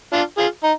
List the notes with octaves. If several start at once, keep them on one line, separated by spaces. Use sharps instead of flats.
D4 F4
F4 G#4
D#4